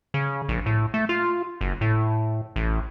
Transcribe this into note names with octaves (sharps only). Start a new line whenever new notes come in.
C#3
A#1
A2
A3
F4
F#1
A2
A1